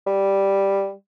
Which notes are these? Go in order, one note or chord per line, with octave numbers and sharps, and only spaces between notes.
G3